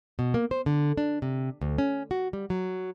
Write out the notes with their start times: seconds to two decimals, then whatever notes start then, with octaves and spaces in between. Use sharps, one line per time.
0.19 B2
0.34 A#3
0.51 C5
0.66 D3
0.97 D4
1.22 C3
1.61 D2
1.78 C#4
2.11 F#4
2.33 G3
2.50 F#3